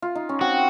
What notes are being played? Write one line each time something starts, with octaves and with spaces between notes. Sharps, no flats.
F4
D#4
C#4
C4 F#4